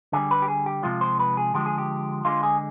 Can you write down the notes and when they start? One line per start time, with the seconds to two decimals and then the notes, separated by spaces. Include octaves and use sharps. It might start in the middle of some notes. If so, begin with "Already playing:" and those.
0.13 D3 G3 G#4
0.31 B4
0.42 G4
0.48 G#4
0.66 G4
0.83 C3 F3 G#3 F4
1.01 C5
1.19 B4
1.37 G#4
1.54 D3 F3 G#3 G4
1.66 G#4
1.78 G4
2.25 D3 G#3 F4
2.43 G#4